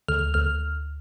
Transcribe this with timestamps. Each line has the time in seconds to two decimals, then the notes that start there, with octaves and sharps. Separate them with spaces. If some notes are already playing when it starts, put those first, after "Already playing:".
0.08 D2 F6
0.34 D2 F6